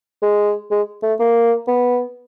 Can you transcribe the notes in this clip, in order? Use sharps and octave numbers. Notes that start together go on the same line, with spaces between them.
G#3
G#3
A3
A#3
B3